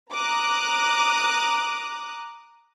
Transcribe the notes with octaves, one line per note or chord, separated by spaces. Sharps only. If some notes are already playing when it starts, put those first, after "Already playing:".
A#5 D6 D#6 F#6